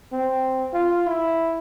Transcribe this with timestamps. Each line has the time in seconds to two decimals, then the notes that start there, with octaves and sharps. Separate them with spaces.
0.13 C4
0.73 F4
1.07 E4